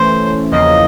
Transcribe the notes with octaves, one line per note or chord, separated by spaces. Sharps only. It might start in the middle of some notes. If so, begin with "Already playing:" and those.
Already playing: E3 A3 C#4 C5
E2 C#3 F3 A#3 D#5